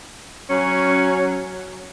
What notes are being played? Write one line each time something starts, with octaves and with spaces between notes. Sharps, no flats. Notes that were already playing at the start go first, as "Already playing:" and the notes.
F#3 C#4